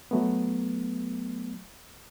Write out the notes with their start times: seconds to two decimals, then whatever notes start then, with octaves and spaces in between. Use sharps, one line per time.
0.11 F#3 A3 B3